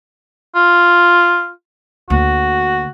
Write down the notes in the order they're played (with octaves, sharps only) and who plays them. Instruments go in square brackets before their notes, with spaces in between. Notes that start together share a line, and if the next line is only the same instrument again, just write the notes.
[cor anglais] F4
[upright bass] D2 A#3 [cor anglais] F#4